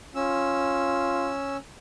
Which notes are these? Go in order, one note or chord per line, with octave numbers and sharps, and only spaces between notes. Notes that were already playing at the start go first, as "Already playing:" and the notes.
C#4 F4 E6